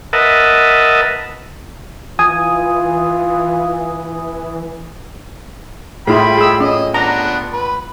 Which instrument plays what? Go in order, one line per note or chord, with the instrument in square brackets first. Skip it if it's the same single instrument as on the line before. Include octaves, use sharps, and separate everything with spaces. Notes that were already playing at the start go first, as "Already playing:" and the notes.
[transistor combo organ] A#4 B4 D#5 E5 F#5 A5
[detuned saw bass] E3 [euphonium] F4 [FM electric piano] G#5 D#6
[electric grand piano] A2 F4 C6 [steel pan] E4 G#4 [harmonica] G5 B5
[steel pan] G#4 E6
[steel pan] C#4 [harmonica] D#5
[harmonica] B3 D4 [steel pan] A#5
[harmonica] B4